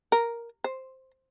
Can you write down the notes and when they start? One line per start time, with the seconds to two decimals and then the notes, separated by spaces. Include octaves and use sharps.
0.12 A#4
0.64 C5